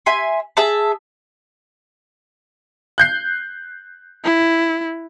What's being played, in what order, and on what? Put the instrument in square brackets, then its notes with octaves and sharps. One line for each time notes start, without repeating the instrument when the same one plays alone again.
[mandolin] E5 G#5 C6
G#4 E5 A5
[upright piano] F#6 G6 C7
[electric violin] E4